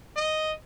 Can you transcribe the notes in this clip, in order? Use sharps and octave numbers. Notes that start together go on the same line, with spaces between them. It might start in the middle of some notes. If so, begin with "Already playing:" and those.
D#5